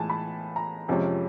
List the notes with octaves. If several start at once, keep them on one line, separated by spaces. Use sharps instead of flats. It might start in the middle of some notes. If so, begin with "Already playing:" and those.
Already playing: A2 E3 G#3 G#5 A5
B5
A#5
F2 C3 F3 G#3 C#4